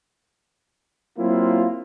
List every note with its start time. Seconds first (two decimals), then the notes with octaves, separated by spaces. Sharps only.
1.18 F#3 A#3 C4 E4 F4